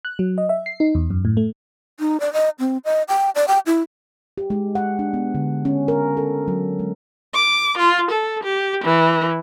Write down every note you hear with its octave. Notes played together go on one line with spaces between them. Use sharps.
F#6
F#3
D#5
E5
C7
D#4
E2
F#2
A2
A3
D#4
D5
D#5
C4
D#5
G5
D5
G5
E4
G4
G#3
F#5
D4
B3
D3
C#4
A#4
A4
F#3
G#3
D6
F4
A4
G4
E3